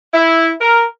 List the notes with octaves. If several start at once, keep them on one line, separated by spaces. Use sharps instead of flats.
E4
A#4